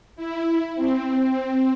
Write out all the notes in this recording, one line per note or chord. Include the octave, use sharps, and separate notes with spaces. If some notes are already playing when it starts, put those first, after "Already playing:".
E4
C4